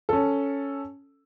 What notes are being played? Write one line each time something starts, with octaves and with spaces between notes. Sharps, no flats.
C#4 A4